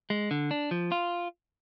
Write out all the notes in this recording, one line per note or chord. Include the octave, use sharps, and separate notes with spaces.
G#3
D3
D4
F3
F4